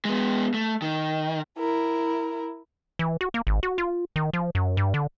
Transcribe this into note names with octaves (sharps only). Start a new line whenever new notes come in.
G#3 B3
A3
D#3
E4 A#4
E3
F#4
A#3
G#1
F#4
F4
D#3
F3
F#2
G2
D3